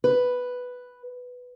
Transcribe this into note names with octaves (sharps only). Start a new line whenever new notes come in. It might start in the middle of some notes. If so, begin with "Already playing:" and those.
B4